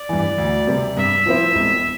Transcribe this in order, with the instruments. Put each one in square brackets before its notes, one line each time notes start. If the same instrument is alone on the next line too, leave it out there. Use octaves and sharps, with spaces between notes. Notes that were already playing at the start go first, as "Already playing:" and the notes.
Already playing: [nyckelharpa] D5
[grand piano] G2 E3
D2
C3 G3
[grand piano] G2 [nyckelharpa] E5
[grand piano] F3 C4 E4
E1